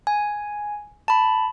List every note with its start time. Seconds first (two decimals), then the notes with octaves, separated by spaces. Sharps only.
0.07 G#5
1.08 A5 B5